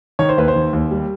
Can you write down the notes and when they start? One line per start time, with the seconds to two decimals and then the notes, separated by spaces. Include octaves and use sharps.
0.19 D#3 C#5
0.29 C5
0.38 D#2 B4
0.48 C5
0.55 D#3
0.73 D#2
0.91 G3